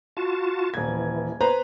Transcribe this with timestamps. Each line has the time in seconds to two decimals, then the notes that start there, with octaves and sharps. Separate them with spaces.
0.17 F4 F#4 A5
0.74 D#1 G#6
0.88 E3
1.41 B4 C5 A#5